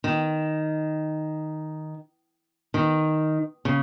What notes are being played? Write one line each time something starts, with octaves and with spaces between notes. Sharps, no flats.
D#3
D#3
C#3